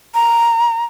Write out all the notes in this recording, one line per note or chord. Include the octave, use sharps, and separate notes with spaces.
A#5